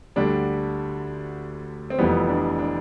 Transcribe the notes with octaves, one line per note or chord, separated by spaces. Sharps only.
D2 D3 G3 D4
C4
F1 F2 E3 G3 B3
D4
D4